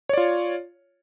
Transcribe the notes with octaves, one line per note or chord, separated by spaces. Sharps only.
F4 C#5 D5